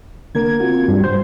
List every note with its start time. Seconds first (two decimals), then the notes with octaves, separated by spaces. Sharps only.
0.35 D3 A#3 A#4 G#6
0.60 C4 F4 F#4
0.88 G2
1.04 G2 C5 G6